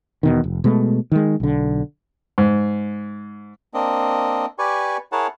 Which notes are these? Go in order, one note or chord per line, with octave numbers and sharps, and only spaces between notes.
E2 B2 D#3
F1
B2 G#3 A3
D#3 G#3
B1 D3
G#2
A#3 C4 D4 D#5
G4 B4 D5 G#5 C#6
E4 G#4 A#4 C#5 F#5 A5